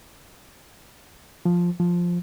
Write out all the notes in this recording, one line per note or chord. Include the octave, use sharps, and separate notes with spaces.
F3
F3